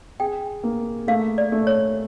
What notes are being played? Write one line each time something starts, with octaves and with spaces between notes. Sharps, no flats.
G#4 G5
A#3
A3 F5
D5
A3
C#5